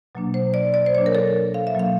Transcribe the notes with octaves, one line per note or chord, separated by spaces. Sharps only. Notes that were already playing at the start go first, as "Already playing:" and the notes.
B2 F#3 A#3 D4
C5
D5
D5
C5
B2 F#3 A#3 D4 C#5
A#4
A4
F5
E5
B2 F#3 A#3 D4 F5